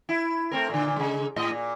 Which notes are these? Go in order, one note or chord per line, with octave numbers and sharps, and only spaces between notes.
E4
A3 C4 A#4
A#2 D3
C#3 G#3
A2 D#5
A#2